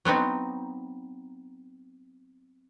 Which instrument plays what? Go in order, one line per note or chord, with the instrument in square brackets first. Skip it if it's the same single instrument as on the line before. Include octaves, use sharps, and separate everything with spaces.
[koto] F#3 B3 C4 D#4